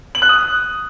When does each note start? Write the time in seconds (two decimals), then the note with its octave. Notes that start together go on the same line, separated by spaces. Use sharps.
0.15 F#7
0.22 F#6
0.29 D#6